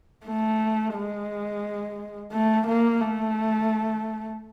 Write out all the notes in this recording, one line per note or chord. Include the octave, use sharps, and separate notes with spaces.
A3
G#3
A3
A#3
A3